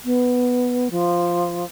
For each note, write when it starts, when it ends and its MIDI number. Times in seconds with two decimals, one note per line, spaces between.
0.04 0.88 59
0.90 1.64 53